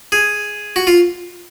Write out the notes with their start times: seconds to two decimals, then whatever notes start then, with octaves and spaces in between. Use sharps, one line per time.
0.12 G#4
0.76 F#4
0.87 F4